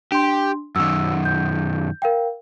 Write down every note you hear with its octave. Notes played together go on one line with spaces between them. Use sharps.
D4 G4 C6
F#2 D#3 E6
G6
A#4 F5 G5